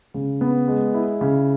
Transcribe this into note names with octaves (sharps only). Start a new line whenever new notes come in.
C#3
B3
G#3
E4
C#3